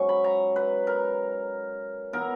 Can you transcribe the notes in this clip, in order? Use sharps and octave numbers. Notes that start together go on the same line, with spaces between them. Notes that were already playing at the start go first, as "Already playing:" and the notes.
Already playing: G#2 F#3 C#4 C#6
B5
A#5
B4
A#4
E3 B3 E4 A#4